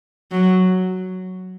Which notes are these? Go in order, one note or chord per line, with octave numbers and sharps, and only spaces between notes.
F#3